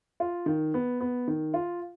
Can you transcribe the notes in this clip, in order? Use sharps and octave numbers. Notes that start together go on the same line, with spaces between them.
F4
D#3
B3
B3
D#3
F4